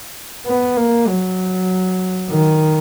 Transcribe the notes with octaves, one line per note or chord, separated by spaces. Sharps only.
B3
A#3
F#3
D#3